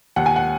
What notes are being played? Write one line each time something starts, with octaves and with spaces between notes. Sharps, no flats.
D#2 F#5
G#5
F#5